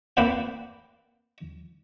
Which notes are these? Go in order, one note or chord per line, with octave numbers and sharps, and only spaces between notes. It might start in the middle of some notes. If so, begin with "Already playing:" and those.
A#3 C4 B4 C5 F#5